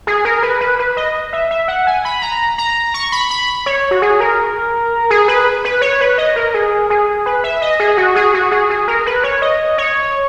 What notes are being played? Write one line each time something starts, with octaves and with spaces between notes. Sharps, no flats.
G#4
A#4
B4
B4
B4
D#5
E5
E5
F#5
G#5
B5
A#5
A#5
C#6
B5
B5
C#5
F#4
G#4
A#4
G#4
B4
B4
C#5
B4
D#5
A#4
G#4
G#4
B4
E5
D#5
G#4
F#4
G#4
F#4
G#4
G#4
A#4
B4
C#5
D#5
C#5